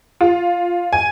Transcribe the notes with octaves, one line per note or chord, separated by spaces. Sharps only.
F4
G#5